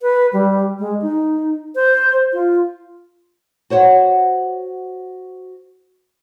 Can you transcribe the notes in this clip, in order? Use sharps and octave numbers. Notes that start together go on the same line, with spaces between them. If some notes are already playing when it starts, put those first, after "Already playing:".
B4
G3
G#3
D#4
C5
F4
F#4 C5 C#5 F#5